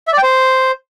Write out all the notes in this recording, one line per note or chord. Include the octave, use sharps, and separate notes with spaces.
E5
D5
G5
C5